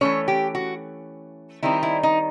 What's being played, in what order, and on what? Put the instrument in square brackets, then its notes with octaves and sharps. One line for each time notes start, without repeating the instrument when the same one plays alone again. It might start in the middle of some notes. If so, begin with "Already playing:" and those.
[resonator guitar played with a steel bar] E3 A3 C#4 C#5
G4
F#4
D#3 G3 C4 D#4 E4
E4
D#4